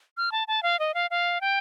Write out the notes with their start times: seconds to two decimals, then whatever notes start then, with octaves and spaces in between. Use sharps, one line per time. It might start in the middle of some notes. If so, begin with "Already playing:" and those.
0.17 F6
0.32 A5
0.48 A5
0.63 F5
0.79 D#5
0.94 F5
1.10 F5
1.41 G5